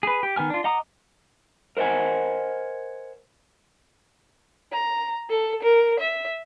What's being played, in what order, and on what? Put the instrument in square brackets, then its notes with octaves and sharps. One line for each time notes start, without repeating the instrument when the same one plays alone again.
[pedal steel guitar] G#4 B4
G4
D#3 B3 G#5 F6
D4 F4
D#5 F#5 A#5 D6 D#6
[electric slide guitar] A#4 C5 D#5 F#5 G#5
[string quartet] A#5
A4
A#4
E5